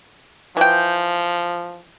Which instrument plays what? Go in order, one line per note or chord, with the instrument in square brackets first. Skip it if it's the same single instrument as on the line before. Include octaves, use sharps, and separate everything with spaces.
[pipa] E3 G5 [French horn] F3